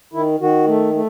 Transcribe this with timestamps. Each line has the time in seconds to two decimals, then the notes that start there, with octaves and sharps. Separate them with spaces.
0.14 D#3 E4
0.40 D#3 F#4
0.67 A3
0.94 A3